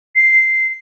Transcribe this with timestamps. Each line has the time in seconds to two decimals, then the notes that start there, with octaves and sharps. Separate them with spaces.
0.16 C7